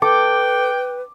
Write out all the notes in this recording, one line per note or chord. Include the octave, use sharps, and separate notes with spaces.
A4 B4 G5 D6